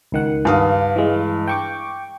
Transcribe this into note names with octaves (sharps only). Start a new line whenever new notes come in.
C#2 D#3 F#5
G2 F5 D#6
E3 G#3
G5 C#6 D6